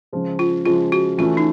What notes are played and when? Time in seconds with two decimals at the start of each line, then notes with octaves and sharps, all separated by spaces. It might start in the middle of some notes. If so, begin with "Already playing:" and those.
0.13 C#3 F3 G#3
0.39 F4
0.65 C#3 F3 G#3 F4
0.92 F#4
1.18 E3 A3 C#4 F4
1.37 D#4